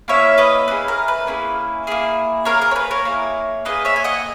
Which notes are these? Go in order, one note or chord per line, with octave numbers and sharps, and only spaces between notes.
A#3 C#4 E4 C#5 E5
B4 D#5
A#3 C#4 E4 G#4 B4
A#4
B4
A#3 C#4 E4 G#4
A#3 C#4 E4 G#4
A#3 E4 G#4 A#4 C#5
A#4
C#5
B4
A#4 C#5
A#3 E4 G#4
A#3 E4 G#4 B4 D#5
C#5 E5
G#5
D#5 F#5